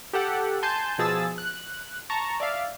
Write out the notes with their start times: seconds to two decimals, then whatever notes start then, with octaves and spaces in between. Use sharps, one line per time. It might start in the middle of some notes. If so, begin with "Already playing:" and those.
0.13 G4 A4 F#5
0.63 G#5 A5 C6 G6
0.98 B2 F3 G#4 A5 E6 A6
1.38 F#6
2.10 A5 A#5 C#6
2.40 D5 E5 F5